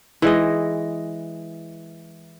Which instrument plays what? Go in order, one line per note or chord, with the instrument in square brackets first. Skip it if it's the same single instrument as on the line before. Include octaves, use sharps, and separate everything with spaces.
[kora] E3 G#3 D#5